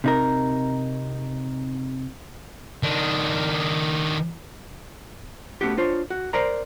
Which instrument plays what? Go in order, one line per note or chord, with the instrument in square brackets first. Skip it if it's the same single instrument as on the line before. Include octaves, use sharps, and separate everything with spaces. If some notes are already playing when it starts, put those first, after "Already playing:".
[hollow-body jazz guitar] C3 D#4 A#4
[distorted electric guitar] D#3 D4
[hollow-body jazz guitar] A3 B3 C#4 F#4 G4
D4 F4 C5 C#5
F#4
A#4 C5 D5 A#5